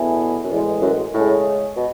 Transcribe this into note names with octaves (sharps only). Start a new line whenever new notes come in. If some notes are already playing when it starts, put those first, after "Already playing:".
Already playing: E2 B2 A3 E4 G#4
F#2
E2 A2 E3 G#3
F#2
A2 C#3 G#3 C#4 G#4
B2